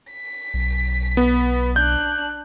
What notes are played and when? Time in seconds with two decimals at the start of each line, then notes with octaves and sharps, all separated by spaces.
0.12 B6
0.54 B1
1.17 B3
1.76 D4 F#6 G6